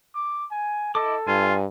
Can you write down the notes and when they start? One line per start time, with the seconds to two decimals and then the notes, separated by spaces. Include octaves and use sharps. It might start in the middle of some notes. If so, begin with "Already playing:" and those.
0.15 D6
0.51 G#5
0.95 E4 A4 D#5 D6
1.27 G2 F4 G#5